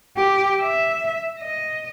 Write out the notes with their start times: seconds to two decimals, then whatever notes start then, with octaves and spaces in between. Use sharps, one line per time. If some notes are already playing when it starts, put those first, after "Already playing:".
0.17 G4
0.61 E5
1.39 D#5